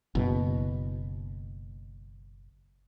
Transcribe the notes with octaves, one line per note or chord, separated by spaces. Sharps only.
F#1 B2